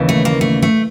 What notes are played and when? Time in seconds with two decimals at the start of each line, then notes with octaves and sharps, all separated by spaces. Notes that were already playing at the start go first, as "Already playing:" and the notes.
Already playing: D#2 C#3 E3
0.09 A3
0.25 A#3
0.41 A3
0.62 A3